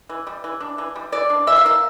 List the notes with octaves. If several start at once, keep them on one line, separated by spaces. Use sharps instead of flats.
E3
G3
E3
D4
E3
G3
E3 D5
D4
E3 E5
F5
A#3 E5